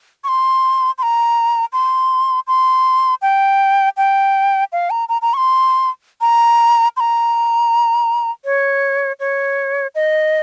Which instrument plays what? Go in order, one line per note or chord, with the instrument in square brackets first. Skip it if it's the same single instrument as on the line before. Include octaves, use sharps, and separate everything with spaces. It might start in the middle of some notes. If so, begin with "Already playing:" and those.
[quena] C#6
C6
C6
A#5
C6
C6
G5
G5
F5
A#5
A#5
A#5
C#6
C6
A#5
C6
A#5
C#5
C#5
D#5